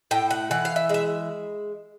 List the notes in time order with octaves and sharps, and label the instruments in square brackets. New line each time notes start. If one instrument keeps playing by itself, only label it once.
[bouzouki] A2 G5
F#5
E3 F#5
F5
E5
G#3 E5